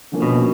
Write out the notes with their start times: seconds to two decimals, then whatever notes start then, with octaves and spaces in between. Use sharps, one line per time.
0.12 D3 F3 A#3 C#4
0.22 B2